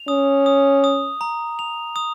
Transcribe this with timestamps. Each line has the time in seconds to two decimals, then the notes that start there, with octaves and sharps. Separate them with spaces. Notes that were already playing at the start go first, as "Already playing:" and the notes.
Already playing: F7
0.08 C#4 D#6
0.46 D#6
0.84 D#6
1.21 A#5
1.59 F7
1.96 D#6